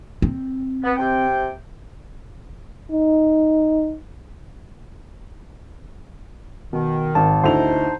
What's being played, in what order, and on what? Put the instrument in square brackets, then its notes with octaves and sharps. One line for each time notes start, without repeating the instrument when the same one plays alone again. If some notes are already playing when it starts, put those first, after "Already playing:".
[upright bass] C4
[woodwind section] B3
C3 G5
[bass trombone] D#4
[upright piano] B2 [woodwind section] D#3
[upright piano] G#1 [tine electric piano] A5
[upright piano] D2 E4 F7 [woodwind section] D#4 C5